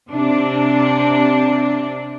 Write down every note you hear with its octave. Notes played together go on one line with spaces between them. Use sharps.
C3 D4